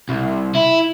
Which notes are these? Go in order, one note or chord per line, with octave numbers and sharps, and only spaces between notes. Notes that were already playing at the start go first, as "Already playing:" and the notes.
C2
E4